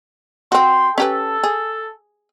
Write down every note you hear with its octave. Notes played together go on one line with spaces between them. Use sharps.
C4 F#4 G5 C6
C#4 G4 A4 B4
G#4